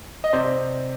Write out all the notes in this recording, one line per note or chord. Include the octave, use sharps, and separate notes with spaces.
D#5
C3 C5 D5